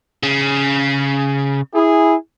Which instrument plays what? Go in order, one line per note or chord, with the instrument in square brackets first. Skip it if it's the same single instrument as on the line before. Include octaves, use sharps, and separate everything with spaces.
[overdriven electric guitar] C#3
[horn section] E4 G#4